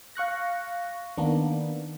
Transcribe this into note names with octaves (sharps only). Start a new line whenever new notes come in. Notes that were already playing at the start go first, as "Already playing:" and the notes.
F5 C#6 F#6 A#6
D#3 A#3 B3 D4